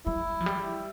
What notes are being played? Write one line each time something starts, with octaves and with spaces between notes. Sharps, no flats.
G3 E4
F3
G3